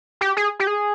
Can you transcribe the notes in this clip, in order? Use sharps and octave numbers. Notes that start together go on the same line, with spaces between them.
G4
G#4
G4
G#4